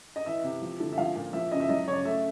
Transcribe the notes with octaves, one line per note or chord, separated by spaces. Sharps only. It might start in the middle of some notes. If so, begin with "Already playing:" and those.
D#5
E3 E5
C3
F3
D3
E5
F3 F5
A#2
F3 E5
C#3 D#5
E5
F#3 D#5
C#3 C#5
D5
A3 E5